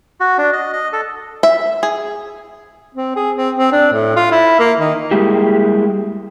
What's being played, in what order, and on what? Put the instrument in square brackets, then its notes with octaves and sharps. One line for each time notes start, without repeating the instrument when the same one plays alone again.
[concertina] F#4
D4
D#5
D#5
A4
[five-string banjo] E5
G#4
[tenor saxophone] C4
G#4
C4
C4
D4
A2
F4
E4
A#3
D#3
[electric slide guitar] G3 G#3 A#3 E4 G4